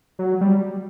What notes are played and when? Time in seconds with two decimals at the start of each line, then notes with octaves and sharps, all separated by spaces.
0.19 F#3
0.41 G3